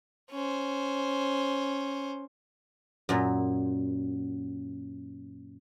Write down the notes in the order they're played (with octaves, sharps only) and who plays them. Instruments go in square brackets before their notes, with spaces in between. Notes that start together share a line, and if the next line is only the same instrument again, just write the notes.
[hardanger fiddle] C#4 C5
[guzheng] F#2 A#2